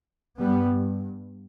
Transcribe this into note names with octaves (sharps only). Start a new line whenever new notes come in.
G2 G3 B3